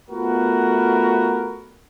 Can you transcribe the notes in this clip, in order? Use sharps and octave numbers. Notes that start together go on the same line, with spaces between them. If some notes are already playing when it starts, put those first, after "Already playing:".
A3 B3 F4 F#4 A#4 B4